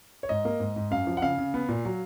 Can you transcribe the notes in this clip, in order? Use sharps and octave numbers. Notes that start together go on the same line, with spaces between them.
C#5
G#2 D#5
A#3
G#2
G#2
F#2 F5
F3
F#5
C#3 F5
C#3
B3
A#2
F#3